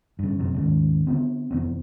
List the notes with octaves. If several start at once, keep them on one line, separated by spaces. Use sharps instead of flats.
G2 C#3
F#2 C3
D#2 G#2 C#3
D3 B3 C4
F1 E2 C4